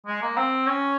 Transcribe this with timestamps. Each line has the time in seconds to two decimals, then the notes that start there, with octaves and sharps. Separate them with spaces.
0.07 G#3
0.22 A#3
0.37 C4
0.67 C#4